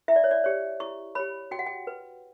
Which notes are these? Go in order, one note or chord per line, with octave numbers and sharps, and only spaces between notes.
E4 E5
D5
C#5
D5
G4 C#5
E4 C#6
G4 C#5 B5
F#4 G5
F#5
G5
B4